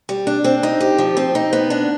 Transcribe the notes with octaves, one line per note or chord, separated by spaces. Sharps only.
G3
D4
C4
D#4
G4
F3
C4
D#4
B3
D4